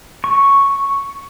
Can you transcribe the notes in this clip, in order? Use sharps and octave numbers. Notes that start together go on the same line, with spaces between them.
C#6